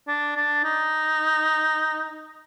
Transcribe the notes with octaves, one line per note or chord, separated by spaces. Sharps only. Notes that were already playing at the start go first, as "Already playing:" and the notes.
D4
D4
D#4